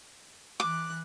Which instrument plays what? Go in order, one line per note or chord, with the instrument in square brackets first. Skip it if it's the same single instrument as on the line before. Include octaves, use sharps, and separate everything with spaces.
[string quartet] E3 F#6 [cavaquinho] D6